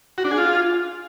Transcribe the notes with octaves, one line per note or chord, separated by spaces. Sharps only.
F#4
D4
G#4
F4